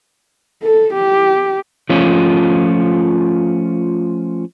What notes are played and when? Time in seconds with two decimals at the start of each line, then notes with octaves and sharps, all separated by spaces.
0.63 A4
0.94 G4
1.89 F3 A3 C#4 F4